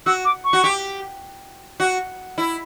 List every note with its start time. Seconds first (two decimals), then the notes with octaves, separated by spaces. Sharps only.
0.06 F#4 E6
0.25 D6
0.44 C#6
0.53 F#4
0.64 G4
1.80 F#4
2.38 E4